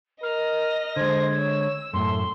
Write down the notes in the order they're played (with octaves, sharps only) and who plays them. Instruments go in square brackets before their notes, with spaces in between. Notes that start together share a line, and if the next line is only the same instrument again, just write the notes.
[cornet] A#4 [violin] D#5 A#6 [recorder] F6
[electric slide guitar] D3 G#3 [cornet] C5 [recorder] G#6
[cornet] C#5 [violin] E6
[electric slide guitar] F#2 A2 [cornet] A3 [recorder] C6